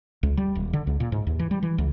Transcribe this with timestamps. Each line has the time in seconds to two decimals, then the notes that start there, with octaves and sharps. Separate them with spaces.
0.23 C#2
0.37 G3
0.55 D#1
0.73 D3
0.87 C#2
1.00 A#2
1.12 G#2
1.27 D#2
1.39 E3
1.51 G3
1.63 E3
1.78 C#2